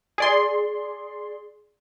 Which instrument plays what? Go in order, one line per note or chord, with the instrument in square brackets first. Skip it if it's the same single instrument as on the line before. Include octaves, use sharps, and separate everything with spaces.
[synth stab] G#4 D5 C6